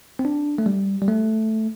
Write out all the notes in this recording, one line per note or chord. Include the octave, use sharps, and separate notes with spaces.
C4
D4
A3
G3
G3
A3